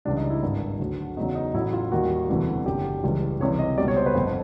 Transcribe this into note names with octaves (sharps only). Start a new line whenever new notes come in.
C#2 C#3 E3 G3 D4
D#4
E4
G#1 G2 D#3
D2 D3 F#3
E2 C#3 F#3 D#4
D#4
A1 A2 F#3 E4
F4
D#2 D#3 G3 F#4
E1 D2 C3 E3 G3
F#1 F#2 D3 G4
C#2 C#3 E3 G3
C#2 C3 E3 G3 C#5
D#5
C#2 B2 G3 D5
C#5
C5
B4
G1 F2 D3 C5